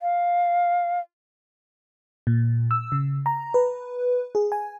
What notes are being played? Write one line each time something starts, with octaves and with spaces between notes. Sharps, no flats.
F5
A#2
E6
C#3
A#5
B4
G#4
G#5